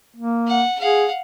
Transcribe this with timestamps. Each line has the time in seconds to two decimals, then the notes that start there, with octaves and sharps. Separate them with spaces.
0.16 A#3
0.47 F#5
0.79 G#4 F5 F#5